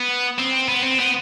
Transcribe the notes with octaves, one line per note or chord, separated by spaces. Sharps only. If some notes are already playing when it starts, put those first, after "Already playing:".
Already playing: B3
C4
B3
C4
B3